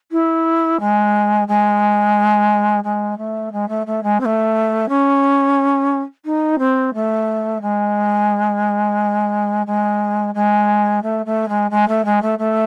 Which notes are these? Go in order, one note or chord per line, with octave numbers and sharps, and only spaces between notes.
E4
G#3
G#3
G#3
A3
G#3
A3
A3
G#3
C4
A3
C#4
D#4
C4
A3
G#3
G#3
G#3
A3
A3
G#3
G#3
A3
G#3
A3
A3